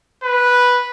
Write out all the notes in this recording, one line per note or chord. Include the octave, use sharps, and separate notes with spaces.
B4